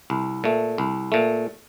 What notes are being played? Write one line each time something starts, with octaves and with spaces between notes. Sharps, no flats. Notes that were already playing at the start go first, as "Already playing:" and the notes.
C2
A#2 A3
C2
A#2 A3